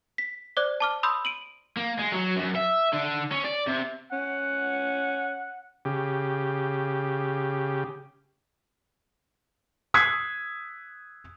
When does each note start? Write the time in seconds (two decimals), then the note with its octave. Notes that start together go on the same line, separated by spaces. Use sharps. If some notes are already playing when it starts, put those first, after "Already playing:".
0.18 B6
0.57 C5 D5 D6 F#6
0.80 A5 D6 F6
1.03 B5 C6 D#6 E6 G6
1.25 D7 D#7 F#7
1.77 A#3
1.99 G#3
2.12 F#3
2.36 F#2
2.55 E5
2.93 D3
3.31 C#4
3.44 D5
3.67 C3
4.13 C#4 F#5
5.85 C#3 G4
9.94 D#6 E6 F#6 G#6 B6 C7